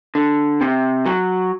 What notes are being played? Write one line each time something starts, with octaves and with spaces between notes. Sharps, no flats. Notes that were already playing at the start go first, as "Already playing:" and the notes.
D3
C3
F#3